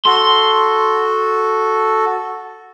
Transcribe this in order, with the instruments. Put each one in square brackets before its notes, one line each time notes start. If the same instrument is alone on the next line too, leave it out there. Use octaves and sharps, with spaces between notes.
[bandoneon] F#4 A4 [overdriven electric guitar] C6